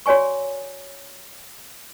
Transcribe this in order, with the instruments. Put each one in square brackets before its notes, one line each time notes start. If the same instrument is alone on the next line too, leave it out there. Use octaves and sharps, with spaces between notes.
[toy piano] F#4 C#5 D5 G#5 C#6